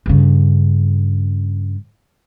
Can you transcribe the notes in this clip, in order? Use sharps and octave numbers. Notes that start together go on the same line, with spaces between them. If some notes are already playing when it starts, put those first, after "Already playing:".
G2 C#3